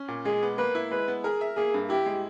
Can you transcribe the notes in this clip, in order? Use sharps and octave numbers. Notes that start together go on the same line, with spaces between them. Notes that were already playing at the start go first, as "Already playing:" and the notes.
Already playing: C#4
A#2
G#3 G#4
B3
A#3 B4
E4
G#3 B4
B3
G#4 A#4
E5
A#3 G#4
G2
E4 G4
G#3